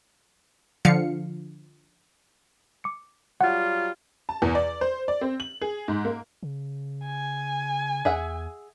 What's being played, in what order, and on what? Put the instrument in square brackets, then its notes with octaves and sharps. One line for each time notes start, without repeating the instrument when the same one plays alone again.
[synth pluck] D3 F3 F5 C#7
[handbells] D6 C#7
[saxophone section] F#3 G3 F4 [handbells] F#5
[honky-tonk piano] A5
E2
D5
C5
D5
C4
F#7
G#4
G#2
A#3
[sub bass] C#3
[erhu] G#5
[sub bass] E2 [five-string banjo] G#4 E5 F#5